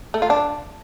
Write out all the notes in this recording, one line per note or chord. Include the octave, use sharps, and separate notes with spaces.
A3
F4
D4